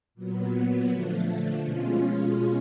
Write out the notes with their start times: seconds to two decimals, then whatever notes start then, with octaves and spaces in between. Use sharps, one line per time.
0.15 A#2 F#3 B3
0.88 D3 F3 A3
1.60 B2 G#3 C#4 F4